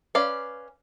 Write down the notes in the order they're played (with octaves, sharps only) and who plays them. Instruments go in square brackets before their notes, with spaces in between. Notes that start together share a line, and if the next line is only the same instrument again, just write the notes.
[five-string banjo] C#4 B4 D5 F5